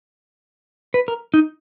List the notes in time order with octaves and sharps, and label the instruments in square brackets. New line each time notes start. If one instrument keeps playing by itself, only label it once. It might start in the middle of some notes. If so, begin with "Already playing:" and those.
[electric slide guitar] B4
A#4
D#4